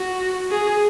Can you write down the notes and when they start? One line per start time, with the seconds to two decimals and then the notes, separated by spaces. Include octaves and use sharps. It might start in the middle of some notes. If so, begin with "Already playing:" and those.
Already playing: F#4
0.51 G#4